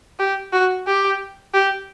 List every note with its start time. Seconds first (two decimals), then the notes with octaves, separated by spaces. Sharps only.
0.19 G4
0.52 F#4
0.87 G4
1.54 G4